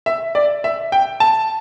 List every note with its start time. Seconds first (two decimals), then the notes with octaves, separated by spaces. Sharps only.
0.06 E5
0.35 D5
0.64 E5
0.92 G5
1.20 A5